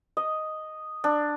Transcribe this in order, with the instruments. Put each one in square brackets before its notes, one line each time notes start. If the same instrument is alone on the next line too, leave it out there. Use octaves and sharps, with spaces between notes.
[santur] D#5
D4